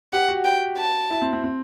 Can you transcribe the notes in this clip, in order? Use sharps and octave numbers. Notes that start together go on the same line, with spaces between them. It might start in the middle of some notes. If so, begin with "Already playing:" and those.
G4 F#5
F#4
G5
A5
E4
C4
C4
C4